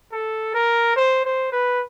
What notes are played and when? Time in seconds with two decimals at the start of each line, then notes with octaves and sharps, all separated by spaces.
0.12 A4
0.54 A#4
0.96 C5
1.25 C5
1.52 B4